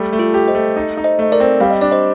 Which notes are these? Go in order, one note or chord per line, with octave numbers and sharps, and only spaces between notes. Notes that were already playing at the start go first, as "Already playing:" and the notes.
Already playing: G3 A3
A3
F4 A4
G4
C5 D#5
A3
D#4
D#4
C5 D#5
A3 D#5
A#4 D5
C4
G3 F5
D#5
D4 D5
C5 D#5